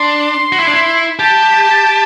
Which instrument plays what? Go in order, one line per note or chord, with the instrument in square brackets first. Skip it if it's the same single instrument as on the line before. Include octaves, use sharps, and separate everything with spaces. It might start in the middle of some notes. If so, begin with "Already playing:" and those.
Already playing: [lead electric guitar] D4 [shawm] C6
[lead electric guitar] F#4
E4
D4
E4
[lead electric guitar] G4 [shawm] A5